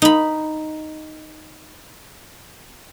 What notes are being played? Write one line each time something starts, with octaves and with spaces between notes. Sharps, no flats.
D#4 B5